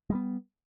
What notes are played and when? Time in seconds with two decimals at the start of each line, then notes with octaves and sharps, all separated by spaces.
0.10 G#3
0.12 G3
0.15 B3